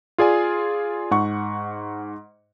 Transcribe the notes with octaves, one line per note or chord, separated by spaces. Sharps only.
F4 G#4 D5 G#5
G#2 F#5 C#6